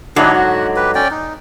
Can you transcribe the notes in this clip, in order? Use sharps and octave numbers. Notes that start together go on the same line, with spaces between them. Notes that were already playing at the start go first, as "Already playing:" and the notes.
G#2 D3 F#3 D4 E4 G4
F#4
G4 B4
C#4 D5 G5
D#4